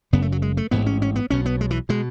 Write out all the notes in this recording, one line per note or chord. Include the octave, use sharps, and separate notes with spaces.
F#1 F#2 C#3 B3
A3
F#3
G#3
A3
A1 G#2 B3
C#4
C#4
B3
B1 B2 C#4
B3
G#3
E3
B2 G#3